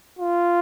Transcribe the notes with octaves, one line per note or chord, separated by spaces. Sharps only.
F4